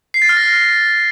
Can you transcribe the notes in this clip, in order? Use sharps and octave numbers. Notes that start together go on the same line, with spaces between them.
C7
A6
F6
A#6